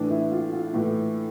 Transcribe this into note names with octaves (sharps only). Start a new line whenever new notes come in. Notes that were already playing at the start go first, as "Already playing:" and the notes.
Already playing: A2 E3 D4
E4
F4
F4
A2 E3